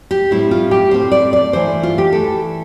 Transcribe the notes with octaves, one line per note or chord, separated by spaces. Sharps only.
G4
A2 G3 C4 E4
F4
G4
A2 G3 C4 C5
D5
D5
G2 E3 A3 C5
F4
G4
E3 A3 A4